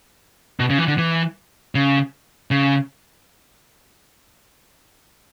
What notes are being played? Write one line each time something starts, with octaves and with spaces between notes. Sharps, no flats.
B2
C#3
E3
D3
E3
C#3
C#3